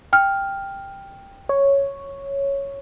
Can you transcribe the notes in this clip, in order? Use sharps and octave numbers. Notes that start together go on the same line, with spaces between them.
G5 F6
C#5